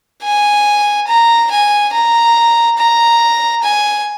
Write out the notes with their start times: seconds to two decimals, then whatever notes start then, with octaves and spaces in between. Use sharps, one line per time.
0.23 G#5
1.08 A#5
1.51 G#5
1.93 A#5
2.78 A#5
3.63 G#5